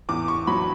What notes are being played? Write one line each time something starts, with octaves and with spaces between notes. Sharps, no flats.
E2 D6
C#6
F#3 B5